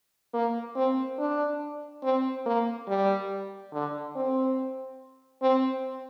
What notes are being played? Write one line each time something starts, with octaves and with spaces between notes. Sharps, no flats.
A#3
C4
D4
C4
A#3
G3
D3
C4
C4